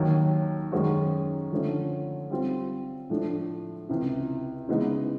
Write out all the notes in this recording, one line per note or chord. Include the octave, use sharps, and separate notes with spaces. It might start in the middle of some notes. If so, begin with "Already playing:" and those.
Already playing: D#2 D#3 F#3
F#2 D#3 G#3 C#4 F#4
D3 F3 A3 C#4
G3 C4 F4
A2 F3 A3 D4
C#2 C3 E3
C#3 E3 G#3 B3 D#4